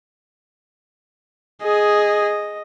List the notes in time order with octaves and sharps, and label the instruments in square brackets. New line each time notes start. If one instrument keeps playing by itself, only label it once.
[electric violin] G#4 [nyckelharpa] D#5